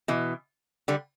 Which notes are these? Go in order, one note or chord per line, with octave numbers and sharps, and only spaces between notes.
B2 E3
D3 G3